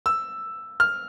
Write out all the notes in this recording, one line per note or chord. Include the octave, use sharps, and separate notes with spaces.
E6
F6